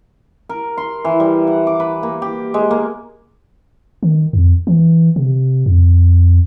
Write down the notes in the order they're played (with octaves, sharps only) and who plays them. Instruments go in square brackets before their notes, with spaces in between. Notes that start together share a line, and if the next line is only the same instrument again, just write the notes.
[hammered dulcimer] A#4
C6
E3
G3
F#5
D6
B4
A#3
G4
G#3
A#3
[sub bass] D#3
F2
E3
C3
F2